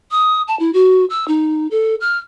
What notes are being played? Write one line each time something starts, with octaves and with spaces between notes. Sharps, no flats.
D#6
A5
E4
F#4
E6
D#4
A4
F6